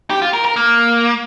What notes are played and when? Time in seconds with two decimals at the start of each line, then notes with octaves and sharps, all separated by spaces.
0.10 G4
0.22 F4
0.33 A#4
0.45 A#4
0.56 A#3